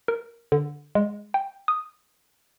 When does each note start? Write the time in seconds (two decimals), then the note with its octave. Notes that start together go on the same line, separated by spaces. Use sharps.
0.08 A#4
0.52 D3
0.95 G#3
1.34 G5
1.68 D#6